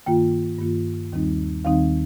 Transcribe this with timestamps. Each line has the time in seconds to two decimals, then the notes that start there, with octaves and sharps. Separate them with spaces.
0.06 G2 D#3 A#3 F4 G5
0.59 G2 D#3 A#3 F4
1.12 D#2 D#3 G3 C4 D#4
1.65 D#2 D#3 G3 C4 D#4 F5